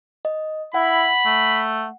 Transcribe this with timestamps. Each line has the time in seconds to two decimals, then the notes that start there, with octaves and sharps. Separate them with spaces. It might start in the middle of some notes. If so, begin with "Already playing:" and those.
0.25 D#5
0.74 E4 F#5 B5
1.26 A3